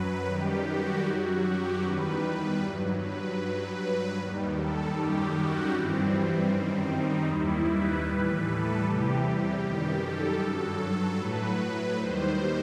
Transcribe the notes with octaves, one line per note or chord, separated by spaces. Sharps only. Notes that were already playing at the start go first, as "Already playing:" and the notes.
Already playing: F#2 F#3 B4
F#2 D#3 G3 G4
F#4
F#2 F#3
G4
E2 D#3 G3 B4
G2 F#3
B4
G2 F#3
B4
D#2 D#3 G3
A4
F#2 D#3 G3 G4
F#4
G2 E3 G3 C4
F#2 D#3 G3
D#4
D#2 D#3 G3 E4
B4
A2 E3 G3
A4
E2 C3 E3 G3 G4
F#2 D#3 G3
A4
G2 F#3
A2 F#3 B4
D#2 D#3 G3 C5